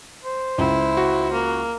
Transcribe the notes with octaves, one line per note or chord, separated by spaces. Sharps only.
C5
C#2 E4
F#4
A#3